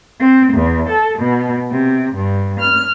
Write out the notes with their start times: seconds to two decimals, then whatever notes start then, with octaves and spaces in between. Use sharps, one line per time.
0.19 C4
0.53 E2
0.87 A4
1.19 B2
1.69 C3
2.15 G2
2.60 F6